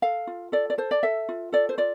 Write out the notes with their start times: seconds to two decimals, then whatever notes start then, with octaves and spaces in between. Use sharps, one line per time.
0.02 A4 F5
0.27 F4
0.52 A4 D5
0.70 D5
0.78 A4 C5
0.91 D5
1.03 A4 E5
1.29 F4
1.52 A4 D5
1.69 C5
1.78 F4 D5